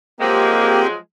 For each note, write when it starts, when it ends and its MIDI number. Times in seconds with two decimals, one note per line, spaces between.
0.20 0.95 53
0.20 0.95 54
0.20 0.95 56
0.20 0.83 58
0.20 0.87 60
0.20 0.87 67